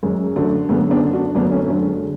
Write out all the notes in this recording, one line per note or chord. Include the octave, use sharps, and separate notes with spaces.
F#2 G#3
D3 F#3 A3
F#2 G#3 B3
B3 D4
D3
D4 F#4
F#2 B3 D4
A3 C#4
D3 F#3 A3
G#3